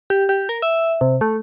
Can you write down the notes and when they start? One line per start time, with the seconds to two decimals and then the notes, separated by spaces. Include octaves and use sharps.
0.10 G4
0.29 G4
0.49 A#4
0.62 E5
1.01 C3
1.21 A3